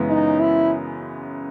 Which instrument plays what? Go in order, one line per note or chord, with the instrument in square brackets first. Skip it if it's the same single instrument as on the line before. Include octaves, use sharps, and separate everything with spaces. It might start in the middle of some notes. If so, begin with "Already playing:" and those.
Already playing: [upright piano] F#2 C#3 E3 G#3 B3
[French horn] D#4
E4